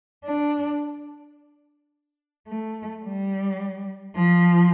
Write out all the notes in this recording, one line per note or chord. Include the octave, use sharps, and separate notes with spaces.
D4
A3
G3
F3